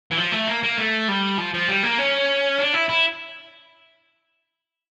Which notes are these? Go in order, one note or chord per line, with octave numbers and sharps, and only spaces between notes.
E3
F3
A3
A#3
A#3
A3
G3
F3
F3
G3
A#3
C#4
D4
E4
E4